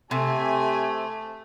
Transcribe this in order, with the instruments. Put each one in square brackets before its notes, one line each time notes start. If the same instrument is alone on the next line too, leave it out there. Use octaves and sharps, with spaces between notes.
[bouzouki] C3 [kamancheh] A3 [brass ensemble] G4 G#5